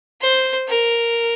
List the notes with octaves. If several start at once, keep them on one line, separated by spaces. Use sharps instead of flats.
C5
A#4